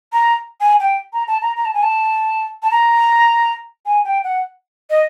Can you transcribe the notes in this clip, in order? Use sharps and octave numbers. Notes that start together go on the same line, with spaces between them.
A#5
G#5
G5
A#5
A5
A#5
A#5
A5
G#5
A5
A5
A#5
G#5
G5
F#5
D#5